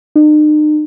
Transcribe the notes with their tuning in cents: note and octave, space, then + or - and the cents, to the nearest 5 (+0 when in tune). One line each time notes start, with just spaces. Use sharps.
D#4 -45